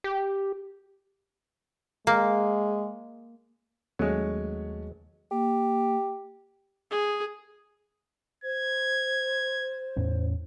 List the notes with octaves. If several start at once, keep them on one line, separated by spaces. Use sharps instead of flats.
G4
G#3 A#3
D#2 F#3 G#3 A3 C#4 C#5
A#3 G4
G#4
C5 G#6
E2 A2 C#4